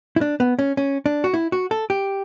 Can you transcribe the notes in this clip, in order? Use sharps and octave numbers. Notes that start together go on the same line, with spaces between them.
E4
D4
B3
C#4
C#4
D4
F#4
E4
F#4
A4
G4